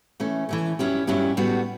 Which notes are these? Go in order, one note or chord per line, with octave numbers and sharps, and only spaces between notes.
E3 A3 C#4
E3 A3 C#4
G2 F#3 C#4 E4 G4
G2 F#3 C#4 E4 G4
A2 G3 B3 F#4